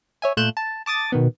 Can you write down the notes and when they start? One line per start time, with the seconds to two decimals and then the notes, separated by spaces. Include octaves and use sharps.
0.22 C#5 E5 G#5
0.37 A#2 A3 F4 F#6 G6 E7
0.57 A5
0.86 A5 D6 D#6 A6
1.12 B2 D#3 B3